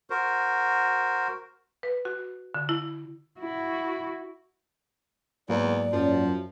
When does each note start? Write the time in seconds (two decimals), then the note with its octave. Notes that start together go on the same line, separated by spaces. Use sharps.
0.10 F#4 A#4 C5
1.83 B4
2.05 F#4
2.55 D3
2.69 E4
3.40 E4 F#4
5.49 E2 G#2 F#3 A#3 D5
5.92 F#2 F3